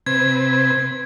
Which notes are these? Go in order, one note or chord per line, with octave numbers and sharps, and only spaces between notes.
C3 C4 B4 G#6